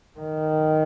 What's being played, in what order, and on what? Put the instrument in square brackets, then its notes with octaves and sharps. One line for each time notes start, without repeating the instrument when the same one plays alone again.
[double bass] D#3